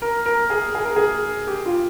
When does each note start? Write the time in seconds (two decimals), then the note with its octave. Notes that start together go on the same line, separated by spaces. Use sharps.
0.02 A#4
0.26 A#4
0.50 G#4
0.75 G#4
0.85 A#4
0.96 G#4
1.47 G4
1.66 F4